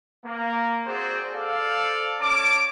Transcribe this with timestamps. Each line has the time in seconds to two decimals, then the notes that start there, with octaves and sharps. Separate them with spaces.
0.25 A#3
0.86 C4 F#4 G#4 C5 D5
1.33 A4 C5 D5 F5
2.21 C#4 C#5 A5 D6